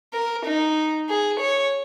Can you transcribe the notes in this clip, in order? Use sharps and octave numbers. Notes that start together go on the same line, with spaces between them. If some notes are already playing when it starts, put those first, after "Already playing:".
A#4
D#4
G#4
C#5